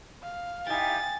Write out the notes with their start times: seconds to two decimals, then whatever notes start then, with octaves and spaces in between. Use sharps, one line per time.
0.22 F5
0.66 D#4 E4 G4 G5 G#5 A6